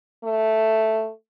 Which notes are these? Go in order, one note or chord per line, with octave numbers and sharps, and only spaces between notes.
A3